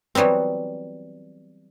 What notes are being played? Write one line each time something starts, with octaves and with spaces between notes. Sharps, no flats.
E3 F#3 G3 B3 C4